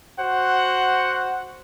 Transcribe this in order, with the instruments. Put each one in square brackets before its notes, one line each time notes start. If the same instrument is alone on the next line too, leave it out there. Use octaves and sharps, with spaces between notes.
[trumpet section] F#4 C5 F#5